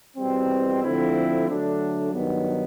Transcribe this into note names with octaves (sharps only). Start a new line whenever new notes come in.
E2 B2 G3 C4
D3 F3 A3 C4 E4
D3 F#3 A3 D4
G2 D#3 F#3 B3 D#4